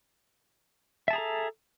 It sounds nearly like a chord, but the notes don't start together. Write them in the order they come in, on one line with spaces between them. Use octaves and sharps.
E5 A5 G#4 A#5 A4